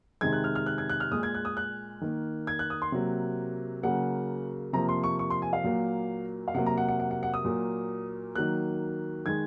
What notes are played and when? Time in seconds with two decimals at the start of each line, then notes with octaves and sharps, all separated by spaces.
0.21 C3 D#3 G#3 G#6
0.33 F#6
0.44 F6
0.55 F6
0.66 F#6
0.78 G#6
0.89 F#6
1.00 F6
1.11 A#2 G#3 D#6
1.23 G#6
1.34 F#6
1.45 D#6
1.57 F#6
2.01 D#3 A#3
2.47 G#6
2.59 F#6
2.70 D#6
2.82 C6
2.92 C3 F#3 A#3
3.83 C#3 F#3 A#3 F#5
4.73 C3 F3 A#3 A#5
4.89 C6
5.04 C#6
5.19 C#6
5.30 C6
5.42 G#5
5.53 F5
5.64 A#2 F#3 A#3
6.48 F5
6.54 C3 F#3 A#3 F#5
6.66 A#5
6.77 F#5
6.88 F#5
7.00 F#5
7.11 F#5
7.23 F#5
7.34 D#6
7.45 A#2 F#3 A#3
8.35 D#3 F#3 A#3 F#6
9.26 D#3 G#3 G#6